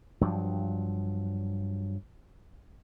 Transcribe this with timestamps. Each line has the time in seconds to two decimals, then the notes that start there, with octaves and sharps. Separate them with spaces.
0.21 G2 F3 F#3